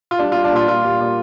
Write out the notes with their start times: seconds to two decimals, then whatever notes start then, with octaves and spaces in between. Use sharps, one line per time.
0.11 F4
0.19 G3 D4
0.32 F4
0.35 G3
0.44 D4
0.52 A#2 F4
0.67 G3 F4
0.84 G3
1.00 A#2